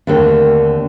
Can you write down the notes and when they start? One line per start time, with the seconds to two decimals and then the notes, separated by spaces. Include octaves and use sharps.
0.07 D#2 D3 A3 C4 D4